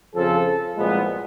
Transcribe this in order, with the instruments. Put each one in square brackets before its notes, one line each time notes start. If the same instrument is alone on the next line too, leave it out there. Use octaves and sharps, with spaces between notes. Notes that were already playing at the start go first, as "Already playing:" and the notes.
[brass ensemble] F2 C#3 F3 A4
C2 A#2 F3 G#3 B3